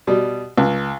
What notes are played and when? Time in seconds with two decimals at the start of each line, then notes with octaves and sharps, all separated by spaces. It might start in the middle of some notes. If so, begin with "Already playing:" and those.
0.07 B2 G3
0.58 C#2